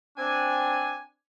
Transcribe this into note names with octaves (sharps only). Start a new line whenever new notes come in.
C4 D4 G#5